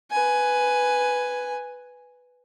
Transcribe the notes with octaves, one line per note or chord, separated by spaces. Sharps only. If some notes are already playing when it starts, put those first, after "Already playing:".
B4 G#5